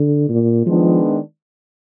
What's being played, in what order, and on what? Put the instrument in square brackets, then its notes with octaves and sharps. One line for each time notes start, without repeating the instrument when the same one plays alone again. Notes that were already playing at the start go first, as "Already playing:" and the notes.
Already playing: [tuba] D3
A#2
[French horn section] D#3 G#3 B3 D4 [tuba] F3